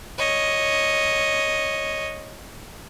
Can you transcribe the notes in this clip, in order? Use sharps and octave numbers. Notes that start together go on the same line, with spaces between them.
C#5 D#5